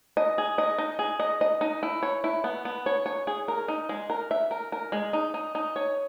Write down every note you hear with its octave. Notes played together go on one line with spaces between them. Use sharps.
D#5
G#4
D#5
D#4
G#4
D#5
D#5
D#4
E4
C#5
E4
B3
B3
C#5
C#5
G#4
A#4
D#4
G#3
A#4
E5
A#4
A#4
G#3
D#4
D#4
D#4
C#5